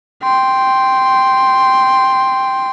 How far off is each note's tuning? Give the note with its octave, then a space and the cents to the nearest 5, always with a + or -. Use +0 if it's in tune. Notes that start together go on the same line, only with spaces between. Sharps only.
G5 +0 C6 +0